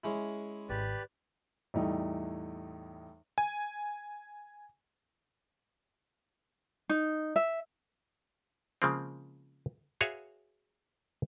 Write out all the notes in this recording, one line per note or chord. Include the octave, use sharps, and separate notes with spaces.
G#3 C#4 E4
G#1 G4 B4 D5
E2 A2 G3 A3 D#4
G#5
D#4
E5
C#3 F3 G#3 A#3 C4
F#4 G#4 B4 C#5 E5 F5